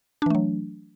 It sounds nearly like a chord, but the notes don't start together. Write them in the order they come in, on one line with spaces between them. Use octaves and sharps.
D4 E3 A3 F#3